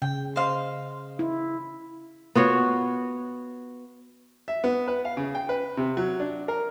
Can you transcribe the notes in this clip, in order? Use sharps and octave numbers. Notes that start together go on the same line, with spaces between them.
C#3 G5
C5 D#5 F5
E4
B3 F4 F#4 C#5
E5
B3
B4
F5
C#3
G5
B4
C3
F#3
D4
A#4